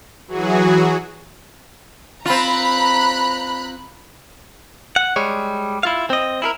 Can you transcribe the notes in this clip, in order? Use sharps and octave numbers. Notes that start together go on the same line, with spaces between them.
E3 F#3 F#4 G#4
C4 F4 A#5 B5 F#6
F#5
G3 G#3 C#5
E4 F4 F5
C4 D#5
E4 G#4 A#4